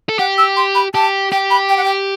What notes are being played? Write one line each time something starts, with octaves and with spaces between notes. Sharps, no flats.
A4
G4 F#5
E6
C6
B5
G4 A5
G4 G5
B5
G5
F#5
G5